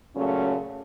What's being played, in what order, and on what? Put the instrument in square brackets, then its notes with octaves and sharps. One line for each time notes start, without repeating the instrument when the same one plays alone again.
[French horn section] A#2 C#3 F#3 A3 C#4